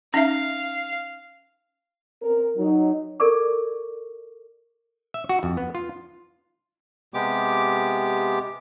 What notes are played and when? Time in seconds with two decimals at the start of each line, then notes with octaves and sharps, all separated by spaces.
0.14 C#4 D#4 E5 F5
2.23 C4 A#4
2.57 F#3 D#4
3.20 A4 A#4 D5 C#6 D6
5.14 E5
5.29 F#4
5.43 F2
5.57 B3
5.75 F4
7.14 C3 G#3 B3 G4 D6